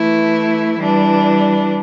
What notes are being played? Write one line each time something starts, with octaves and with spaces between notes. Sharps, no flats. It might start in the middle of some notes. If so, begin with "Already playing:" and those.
Already playing: E3 A3 E4
E3 G3 D4